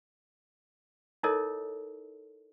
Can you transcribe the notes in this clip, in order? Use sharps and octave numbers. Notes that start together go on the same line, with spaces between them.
D#4 E4 A4 A#4 C#5 D#5